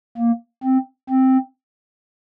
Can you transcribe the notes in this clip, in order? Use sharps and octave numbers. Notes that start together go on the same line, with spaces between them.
A#3
C4
C4